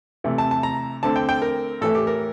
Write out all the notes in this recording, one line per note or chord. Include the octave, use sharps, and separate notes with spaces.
C3 E3 A3
A5
A5
A#5
D3 A3 C4 A5
G5
G5
A#4
A2 E3 A3 A4
G4
A#4